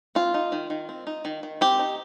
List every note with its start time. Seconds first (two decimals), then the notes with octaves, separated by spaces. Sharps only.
0.15 C4 F4
0.34 D#4
0.52 D#3
0.70 D#3
0.89 C4
1.07 D#4
1.25 D#3
1.43 D#3
1.61 C4 G4
1.79 D#4